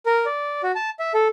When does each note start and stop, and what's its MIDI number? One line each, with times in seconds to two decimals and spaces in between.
0.06 0.25 70
0.26 0.62 74
0.63 0.72 66
0.75 0.90 81
0.99 1.12 76
1.14 1.28 69